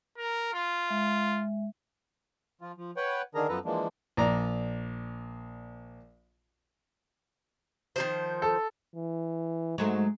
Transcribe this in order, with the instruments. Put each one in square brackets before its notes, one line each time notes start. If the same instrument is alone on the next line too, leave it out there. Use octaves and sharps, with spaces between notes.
[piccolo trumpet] A#4
F4
[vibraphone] G#3 E5
[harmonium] F3 F4
F3
B4 C#5 F#5 G5
D3 D#3 D4 G#4 A#4 A#5
F#2 F3 B3 A4 B4 A#5
E3 F3 G#3 A#3 D4
[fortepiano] A#1 D5 A#5
[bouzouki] D#3 F3 C5
[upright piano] A4
[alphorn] E3
[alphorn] G#2 [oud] F#3 G#3 A3